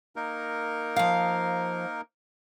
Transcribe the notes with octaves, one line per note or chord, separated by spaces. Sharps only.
A#3 D#4 A#4
F3 F5